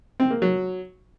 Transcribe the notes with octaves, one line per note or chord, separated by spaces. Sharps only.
C4
A#3
F#3